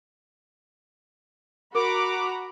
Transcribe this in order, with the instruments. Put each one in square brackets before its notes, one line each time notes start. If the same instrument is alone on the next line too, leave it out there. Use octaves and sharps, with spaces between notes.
[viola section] F#4 A#5 B5 [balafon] A#4 [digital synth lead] D6